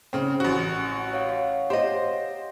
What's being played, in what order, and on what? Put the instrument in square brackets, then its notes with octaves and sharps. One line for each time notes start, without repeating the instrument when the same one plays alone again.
[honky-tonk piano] C#3 C4
A1 F#4
[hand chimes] C#5 F5 F#5
[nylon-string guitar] G4 D#5 [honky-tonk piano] C5